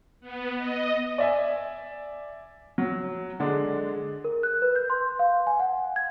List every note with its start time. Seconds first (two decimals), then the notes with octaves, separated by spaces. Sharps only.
0.21 B3
0.57 D#5
1.18 D5 E5 G#5
2.78 F#3
3.40 D3 G#3 D4
4.24 A#4
4.43 F#6
4.62 B4
4.75 G6
4.90 C6
5.19 F5
5.47 G#5
5.59 F#5
5.96 G#6